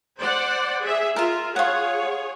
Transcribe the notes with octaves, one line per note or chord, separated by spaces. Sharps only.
C5 D5 F#5
G#4 E5
F4 A#4 E5
F4 G#4 C#5 F#5